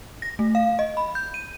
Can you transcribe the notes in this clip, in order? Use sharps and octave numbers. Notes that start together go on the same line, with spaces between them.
A#6
A3
F5
D#5
B5
G6
D#7